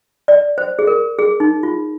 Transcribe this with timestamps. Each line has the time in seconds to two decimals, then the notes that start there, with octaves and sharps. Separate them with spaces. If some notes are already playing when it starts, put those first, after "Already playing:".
0.28 D5
0.58 C5
0.79 G#4
0.87 A#4
1.19 G#4
1.40 D#4
1.63 F4